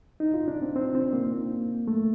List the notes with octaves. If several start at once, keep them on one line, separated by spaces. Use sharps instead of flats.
D#4
F4
D4
C4
C4
C4
A#3
A3